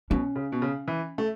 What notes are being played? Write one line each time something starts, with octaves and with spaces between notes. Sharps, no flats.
B2 C#4
C#3
B2
C#3
E3
A3